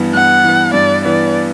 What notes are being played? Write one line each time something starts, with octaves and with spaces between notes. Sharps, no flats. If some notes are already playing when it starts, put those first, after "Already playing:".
Already playing: G2 E3 B3
G2 F#5
E3 B3
G2 D5
E3 B3 D5